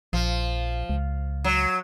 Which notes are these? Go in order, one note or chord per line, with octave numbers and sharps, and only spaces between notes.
A#1 F3
C#2
F#3